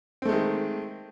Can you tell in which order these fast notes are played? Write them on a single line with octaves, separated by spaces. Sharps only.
C4 A3 G#3 D#3